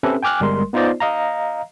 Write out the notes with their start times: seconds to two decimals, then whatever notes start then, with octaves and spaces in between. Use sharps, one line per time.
0.03 C4 C#4 G4 A4 B4 E5
0.23 G5 G#5 D6 F6 F#6
0.40 G1 G3 G#3 A#4 C6
0.73 B3 D#4 F4 C5 D5 D#5
1.00 D#5 F5 A#5